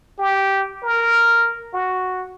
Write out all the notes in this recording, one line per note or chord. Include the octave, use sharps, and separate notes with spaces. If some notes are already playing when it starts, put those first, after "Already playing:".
G4
A#4
F#4